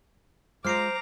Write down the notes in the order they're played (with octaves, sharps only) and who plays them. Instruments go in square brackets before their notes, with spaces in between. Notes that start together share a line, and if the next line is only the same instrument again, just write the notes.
[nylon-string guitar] G#3 F4 [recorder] C5 [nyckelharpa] A#5 D6 [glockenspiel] F6 C7 D7